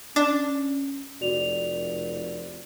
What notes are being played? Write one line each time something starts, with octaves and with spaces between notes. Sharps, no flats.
C#4 D4
F1 F#4 D5 F7